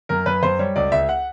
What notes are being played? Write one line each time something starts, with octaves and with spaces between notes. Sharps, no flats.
F#2 A#4
F#2 B4
F#2 C5
G3 C#5
C#2 D5
C#2 E5
F#5